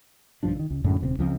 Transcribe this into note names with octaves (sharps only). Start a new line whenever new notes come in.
B1 G2 F3 D4
D3 D#3
C#2
F#2 A2 D3 G#3
D#1 C3 B3 C4
C#2 F3 A3 C4